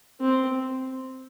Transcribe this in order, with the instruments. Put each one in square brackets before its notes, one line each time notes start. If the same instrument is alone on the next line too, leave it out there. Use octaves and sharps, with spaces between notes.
[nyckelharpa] C4